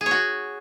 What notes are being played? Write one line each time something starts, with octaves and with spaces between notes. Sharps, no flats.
G#4
C#5
F#4